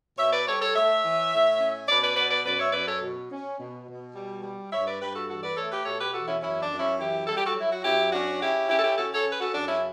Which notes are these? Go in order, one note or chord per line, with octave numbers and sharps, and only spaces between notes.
B2 C#5 E5
B4 D5
G3 A4 C#5
A4 C#5
A3 C#5 E5
E3
A2
C#4
B2 B4 D5
B4 D5
B3 B4 D5
B4 D5
F#2 B4 D5
C#5 E5
F#2 B4 D5
A4 C#5
B2
C#4
B2
B2
G3
G3
G2 C#5 E5
B4 D5
G2 G4 B4
F#4 A4
E2 F#4 A4
B4 D5
A3 A4 C#5
G4 B4
B2 A4 C#5
G4 B4
E2 F#4 A4
C#4 E4
F#2 C#4 E4
D4
F#2
C#4 E4
E3 E4 G4
G3 A4
G4
F#4 A4
F#3 E4
F#4
F#2 E4 G4
C#4 D4 F#4
C#3 E4 G4
C#4 E4 G4
A4
E4 G4
C#4 F#4 A4
A4 C#5
C#3
B4
F#4 A4
F#2 D4
C#4 E4